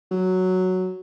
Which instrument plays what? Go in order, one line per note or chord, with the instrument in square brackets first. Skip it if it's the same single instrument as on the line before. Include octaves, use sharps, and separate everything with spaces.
[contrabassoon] F#3